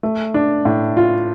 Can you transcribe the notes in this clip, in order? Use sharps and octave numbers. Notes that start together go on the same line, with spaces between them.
A3
D4
A2
F4